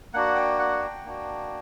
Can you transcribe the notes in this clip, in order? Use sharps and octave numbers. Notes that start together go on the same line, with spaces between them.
A#3 D4 F#4 F#5
G5
F#5
G5
A#3 D4 F#4